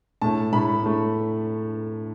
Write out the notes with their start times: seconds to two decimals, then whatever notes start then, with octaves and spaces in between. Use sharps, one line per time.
0.22 A2 A3 A5
0.53 A2 A3 B5
0.83 A2 A3